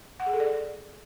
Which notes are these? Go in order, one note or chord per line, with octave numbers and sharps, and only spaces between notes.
F#5
G#4
A4
D5